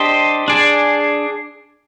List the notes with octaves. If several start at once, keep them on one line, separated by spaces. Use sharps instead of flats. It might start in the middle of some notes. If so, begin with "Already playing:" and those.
Already playing: D4 G4 C5 D#5
D4 G#4 D5